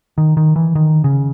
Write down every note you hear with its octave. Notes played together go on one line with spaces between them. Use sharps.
D#3
D#3
E3
D#3
C#3